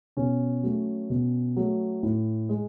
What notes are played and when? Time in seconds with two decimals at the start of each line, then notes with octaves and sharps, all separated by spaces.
0.17 B2 C#4
0.63 F#3 A3
1.10 B2
1.56 F#3 A3
2.03 A2
2.49 G#3